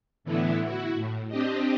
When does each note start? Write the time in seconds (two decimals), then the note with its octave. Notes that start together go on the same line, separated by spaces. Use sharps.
0.24 A2 D3 E3 B3 E4
0.64 E4 F#4
0.95 A2
1.29 C4 D4 G4 D#5